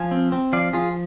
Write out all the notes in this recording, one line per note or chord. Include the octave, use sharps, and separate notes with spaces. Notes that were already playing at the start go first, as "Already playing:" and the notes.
Already playing: F3 F5 G#5
C4
C4
F3 D5 F5
F3 F4 G#4